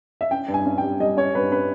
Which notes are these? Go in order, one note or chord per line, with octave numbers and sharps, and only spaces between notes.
E5
C#4 G5
G2
G#5
C#4
G5
G3
G3 D#5
C#4 C#5
G2 B4
C#4 B4